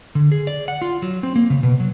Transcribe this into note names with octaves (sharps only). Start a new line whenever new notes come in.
D3
G#4
D5
F#5
F4
F#3
C4
A#3
C#3
B2
F#3